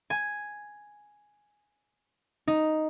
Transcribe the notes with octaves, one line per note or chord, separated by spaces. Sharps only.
G#5
D#4